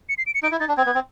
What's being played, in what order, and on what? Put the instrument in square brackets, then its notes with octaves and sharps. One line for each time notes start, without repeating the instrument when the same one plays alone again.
[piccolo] C#7
C7
D7
C#7
[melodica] D#4 [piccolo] D7
[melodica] E4
[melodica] D#4 [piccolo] A6
[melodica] D4
[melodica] C4 [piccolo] G#6
[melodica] B3
C4